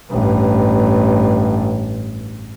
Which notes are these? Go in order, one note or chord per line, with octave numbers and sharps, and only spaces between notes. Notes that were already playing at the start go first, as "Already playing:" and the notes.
A1 G2